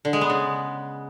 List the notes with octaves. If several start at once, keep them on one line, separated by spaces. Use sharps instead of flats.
D3
G#3
B3
C#3